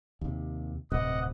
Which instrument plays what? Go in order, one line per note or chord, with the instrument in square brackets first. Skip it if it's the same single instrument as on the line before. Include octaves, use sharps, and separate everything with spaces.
[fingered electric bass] D#2 C3
[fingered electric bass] D1 G2 C3 [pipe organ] D#5 F#5